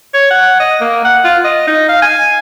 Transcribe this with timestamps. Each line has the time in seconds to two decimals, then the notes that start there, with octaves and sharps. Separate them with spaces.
0.14 C#5
0.31 F#5
0.60 D#5
0.81 A#3
1.05 F#5
1.24 F4
1.44 D#5
1.67 D#4
1.89 F5
2.02 G#5